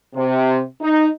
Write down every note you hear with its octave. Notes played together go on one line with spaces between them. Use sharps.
C3
D#4